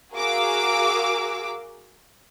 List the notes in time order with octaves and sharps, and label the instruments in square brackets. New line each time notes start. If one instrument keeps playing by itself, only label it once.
[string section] F#4 G#4 A#4 F5 D6 E6